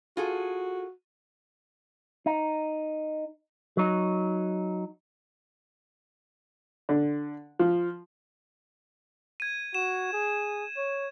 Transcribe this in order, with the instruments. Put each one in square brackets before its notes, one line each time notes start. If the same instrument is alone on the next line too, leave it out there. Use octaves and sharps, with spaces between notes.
[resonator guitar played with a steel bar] F4 G#4 A4 [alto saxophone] F#4
[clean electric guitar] D#4
F#3 D#4
[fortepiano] D3
F3
[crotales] G#6 D#7
[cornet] F#4 [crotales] E7
[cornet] G#4
C#5